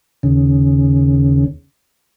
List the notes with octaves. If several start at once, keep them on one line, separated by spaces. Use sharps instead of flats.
D#2 C#3